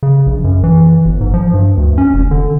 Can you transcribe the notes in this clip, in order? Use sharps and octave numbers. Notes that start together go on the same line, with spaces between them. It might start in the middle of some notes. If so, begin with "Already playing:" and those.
C#3
A#1
F#2
E3
G1
G#2
F3
G2
D2
C#4
F1
D3